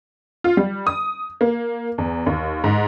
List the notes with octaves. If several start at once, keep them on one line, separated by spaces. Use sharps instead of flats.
F4
G3
D#6
A#3
E2
D#2
G#2